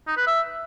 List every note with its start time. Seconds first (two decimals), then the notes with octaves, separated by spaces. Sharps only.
0.07 D#4
0.17 B4
0.27 E5